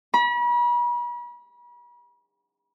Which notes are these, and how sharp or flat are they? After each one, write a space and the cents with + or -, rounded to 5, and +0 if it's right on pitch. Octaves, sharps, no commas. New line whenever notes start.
B5 -40